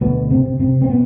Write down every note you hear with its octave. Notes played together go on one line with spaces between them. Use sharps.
D2 B2 B3
C3 C4
C3
C3 C4
C4
B2 B3